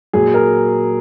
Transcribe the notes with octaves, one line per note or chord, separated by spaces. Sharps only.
A#2 F#3 G#4
A#4